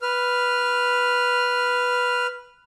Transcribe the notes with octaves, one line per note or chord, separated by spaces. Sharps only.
B4 F6